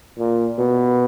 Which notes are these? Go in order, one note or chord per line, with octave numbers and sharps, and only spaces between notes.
A#2
B2